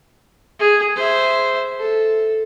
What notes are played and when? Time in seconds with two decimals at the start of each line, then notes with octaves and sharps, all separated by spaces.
0.59 G#4
0.96 C5 E5
1.80 A4